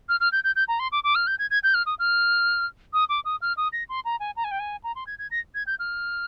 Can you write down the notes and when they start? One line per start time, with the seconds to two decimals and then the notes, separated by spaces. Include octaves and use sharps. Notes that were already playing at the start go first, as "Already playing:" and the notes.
0.09 F6
0.20 F6
0.32 G6
0.44 G6
0.56 G6
0.68 A#5
0.79 C6
0.92 D6
1.04 D6
1.15 F6
1.27 G6
1.39 G#6
1.51 G#6
1.64 G6
1.74 F6
1.86 D#6
1.99 F6
2.93 D#6
3.09 D6
3.25 D#6
3.42 F6
3.57 D#6
3.73 A#6
3.89 C6
4.05 A#5
4.20 G#5
4.36 A#5
4.44 G#5
4.51 G5
4.60 G#5
4.84 A#5
4.96 C6
5.07 G#6
5.19 G#6
5.31 A#6
5.55 G#6
5.67 G6
5.79 F6